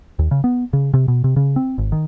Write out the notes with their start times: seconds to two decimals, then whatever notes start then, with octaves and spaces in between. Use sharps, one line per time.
0.19 D#2
0.31 C#3
0.44 B3
0.73 C#3
0.94 C3
1.08 B2
1.24 C3
1.36 C#3
1.56 C4
1.78 G#1
1.92 D#3